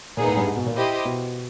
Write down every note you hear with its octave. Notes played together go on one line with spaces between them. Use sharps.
A#2 B3 D#4 G#4
A2
G2
G#2
B2
A#2
E4 G4 C5 D#5
B2